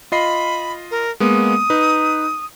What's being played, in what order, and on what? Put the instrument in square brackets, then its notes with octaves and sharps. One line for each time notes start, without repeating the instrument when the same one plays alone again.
[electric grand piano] F4 D#5 C7 [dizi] B5
[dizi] A#4
[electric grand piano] G#3 A#3 B3 [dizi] D#6
[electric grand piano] D#4 B4